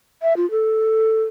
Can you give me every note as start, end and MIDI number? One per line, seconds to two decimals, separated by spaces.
0.22 0.36 76
0.37 0.49 65
0.51 1.24 69